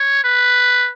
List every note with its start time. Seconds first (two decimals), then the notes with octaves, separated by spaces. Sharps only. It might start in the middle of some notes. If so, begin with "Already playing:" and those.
Already playing: C#5
0.23 B4